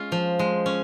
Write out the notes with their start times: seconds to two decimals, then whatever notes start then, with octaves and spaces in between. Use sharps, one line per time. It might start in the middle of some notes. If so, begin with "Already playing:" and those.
Already playing: G#3 C#4 F4
0.12 F3
0.39 G#3
0.66 C#4